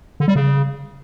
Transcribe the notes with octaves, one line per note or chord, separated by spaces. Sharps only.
D3
G3
C#3